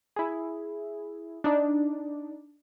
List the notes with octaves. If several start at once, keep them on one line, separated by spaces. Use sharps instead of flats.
E4 G#4
D4 D#4 D5